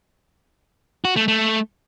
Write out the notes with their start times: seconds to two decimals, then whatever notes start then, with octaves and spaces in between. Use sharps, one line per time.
1.05 F#4
1.16 A3
1.28 A3